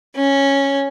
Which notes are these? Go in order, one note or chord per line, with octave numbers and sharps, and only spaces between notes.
C#4